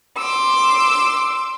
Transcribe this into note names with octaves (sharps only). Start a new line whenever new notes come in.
C6 D6 E6